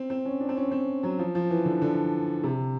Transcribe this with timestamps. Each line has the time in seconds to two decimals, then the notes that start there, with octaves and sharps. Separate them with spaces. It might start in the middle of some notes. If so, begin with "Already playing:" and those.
Already playing: C4
0.10 C4
0.25 C#4
0.40 D4
0.49 C4
0.57 C#4
0.71 C4
1.03 F#3
1.19 F3
1.35 F3
1.50 E3
1.65 D3
1.82 D3
2.44 C3